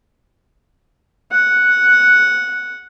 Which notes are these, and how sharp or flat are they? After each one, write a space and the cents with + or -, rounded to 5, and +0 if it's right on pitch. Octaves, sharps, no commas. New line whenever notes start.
F#5 -5